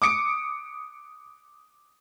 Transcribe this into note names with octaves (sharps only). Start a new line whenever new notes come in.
D6 D#6 C#7 D7